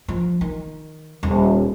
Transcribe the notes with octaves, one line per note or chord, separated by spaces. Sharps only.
F3
D#3
D#1